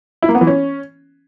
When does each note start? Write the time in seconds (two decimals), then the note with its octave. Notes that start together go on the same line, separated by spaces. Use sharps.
0.22 E4
0.29 A#3
0.35 B3
0.41 E3
0.47 C#4